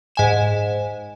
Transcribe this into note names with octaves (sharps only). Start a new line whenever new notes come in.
G#2 G#5 E7